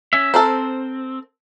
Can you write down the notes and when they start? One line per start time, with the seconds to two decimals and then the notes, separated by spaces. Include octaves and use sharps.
0.13 C#4 E5
0.34 C4 A4 A#4 C5